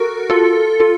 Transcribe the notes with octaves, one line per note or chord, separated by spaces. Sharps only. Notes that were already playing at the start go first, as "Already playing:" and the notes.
Already playing: F#4 A4 A#4
F4 A4
F4 A4